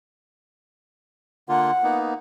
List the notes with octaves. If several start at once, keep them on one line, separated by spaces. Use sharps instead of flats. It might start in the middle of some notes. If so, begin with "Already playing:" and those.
D3 A#3 F4 F#5
A#3 B3 D#4